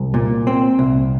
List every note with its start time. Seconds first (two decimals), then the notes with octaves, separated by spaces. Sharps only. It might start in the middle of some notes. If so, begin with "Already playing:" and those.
Already playing: C2
0.14 A#2
0.47 C4
0.79 C2